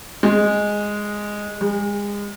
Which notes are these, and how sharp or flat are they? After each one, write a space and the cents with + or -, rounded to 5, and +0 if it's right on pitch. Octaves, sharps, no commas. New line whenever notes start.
G#3 -5
G#3 -30